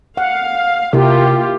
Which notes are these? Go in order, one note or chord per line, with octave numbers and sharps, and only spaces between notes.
F5 F#5
C3 A#3 E4 F4 G4 A#4